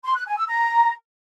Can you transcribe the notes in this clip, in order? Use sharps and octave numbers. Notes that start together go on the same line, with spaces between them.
C6
F#6
G#5
E6
A#5